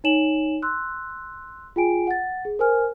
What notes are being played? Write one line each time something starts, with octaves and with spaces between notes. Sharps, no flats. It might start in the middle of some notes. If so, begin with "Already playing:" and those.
D#4 C#5 G#5 E7 F#7
C6 E6 F#6
F4 G#4 G5 G#5 D7
F#5 A6
G#4
A#4 C5 G#5 F6